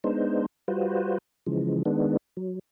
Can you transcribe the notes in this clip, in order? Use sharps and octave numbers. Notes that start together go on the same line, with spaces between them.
G#3 B3 D4 D#4 C5
G3 F4 F#4 B4 C5
C#3 E3 F3 G#3
D#3 G#3 B3 D4
F#3